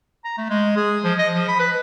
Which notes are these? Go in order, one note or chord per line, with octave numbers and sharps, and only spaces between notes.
A#5
A3
G#3
G#4
F3
D#5
F3
B5
B4